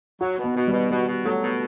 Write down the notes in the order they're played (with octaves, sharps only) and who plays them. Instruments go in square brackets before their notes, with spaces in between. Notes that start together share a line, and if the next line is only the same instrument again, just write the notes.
[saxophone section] F#3 [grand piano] F#4
[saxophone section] B2
[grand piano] B3
[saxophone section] B2
[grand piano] G3
[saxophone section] B2
[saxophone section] B2 [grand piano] G3
[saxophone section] B2
[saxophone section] F#3 [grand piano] A3
[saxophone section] B2